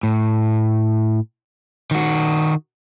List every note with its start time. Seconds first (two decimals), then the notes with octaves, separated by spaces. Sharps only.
0.03 A2
1.91 D#3 F#4